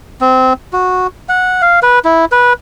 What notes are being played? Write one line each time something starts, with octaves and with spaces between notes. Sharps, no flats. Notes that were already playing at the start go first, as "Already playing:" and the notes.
C4
F#4
F#5
F5
B4
E4
B4